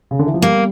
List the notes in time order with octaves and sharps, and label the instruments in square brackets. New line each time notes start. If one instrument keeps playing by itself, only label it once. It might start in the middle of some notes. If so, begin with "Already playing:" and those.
[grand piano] C#3
D3
E3
F3
[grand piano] G3 [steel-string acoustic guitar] A#3